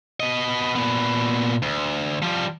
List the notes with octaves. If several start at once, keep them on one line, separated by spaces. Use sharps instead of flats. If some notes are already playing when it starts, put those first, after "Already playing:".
B3 D#5
A#2 B3
D2
F3 G3